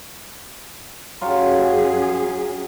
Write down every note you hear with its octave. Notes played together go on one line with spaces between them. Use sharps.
F#2 F#3 C#4 F4 G4 G#4